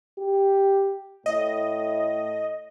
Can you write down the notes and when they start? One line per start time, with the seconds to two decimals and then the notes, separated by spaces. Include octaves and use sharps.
0.19 G4
1.26 A2 D#5